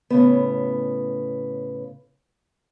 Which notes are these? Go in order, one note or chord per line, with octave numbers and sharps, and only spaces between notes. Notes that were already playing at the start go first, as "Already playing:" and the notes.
A2 C#3 B3